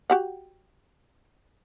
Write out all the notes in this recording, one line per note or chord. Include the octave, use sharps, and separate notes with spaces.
F#4 G4 F#5